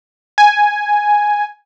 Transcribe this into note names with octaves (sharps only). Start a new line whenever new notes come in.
G#5